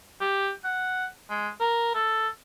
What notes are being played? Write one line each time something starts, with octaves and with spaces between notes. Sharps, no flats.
G4
F#5
G#3
A#4
A4